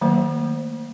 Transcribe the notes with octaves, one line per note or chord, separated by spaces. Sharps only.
D#3 F#3 A3 A#3 C5